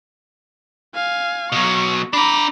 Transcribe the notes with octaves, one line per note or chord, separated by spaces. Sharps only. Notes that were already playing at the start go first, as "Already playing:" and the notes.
F5 G#5
B2 F#3 C#6
D4 A#5 B5 D6